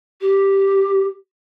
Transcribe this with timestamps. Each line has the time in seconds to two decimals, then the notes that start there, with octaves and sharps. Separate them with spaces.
0.21 G4